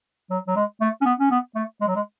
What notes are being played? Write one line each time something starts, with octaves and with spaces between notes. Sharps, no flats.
F#3
F#3
G#3
A3
C#4
B3
C#4
B3
A3
G#3
F#3
G#3